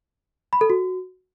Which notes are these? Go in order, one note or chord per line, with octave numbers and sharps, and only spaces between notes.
B5
A4
F#4